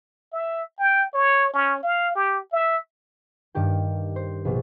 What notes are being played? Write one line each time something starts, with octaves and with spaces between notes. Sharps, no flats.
E5
G5
C#5
C#4
F5
G4
E5
G2 D#3 G4 G5
C5
A#1 B2